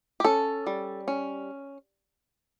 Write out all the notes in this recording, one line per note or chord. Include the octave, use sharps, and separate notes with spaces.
G4
C#4 A4
G3
C#4